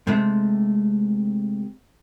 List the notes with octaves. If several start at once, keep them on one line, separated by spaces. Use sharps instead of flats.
C3 G#3 A3